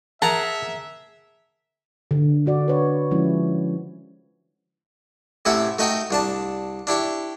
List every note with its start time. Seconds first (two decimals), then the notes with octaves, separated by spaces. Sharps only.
0.22 G#4 A#4 E5 F#5 A5 A#5
2.11 D3
2.46 D4 F#4 D5
2.68 B4 C#5
3.11 F3 G#3 C#4 E4
5.45 A2 C3 C#4 E4 E5 F#5
5.79 A3 D#4 F#4 D#5 G5
6.11 C2 D4 A5
6.87 D4 E4 G4 C#6